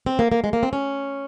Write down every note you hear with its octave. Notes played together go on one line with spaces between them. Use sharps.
C4
A#3
A#3
G#3
A#3
C4
C#4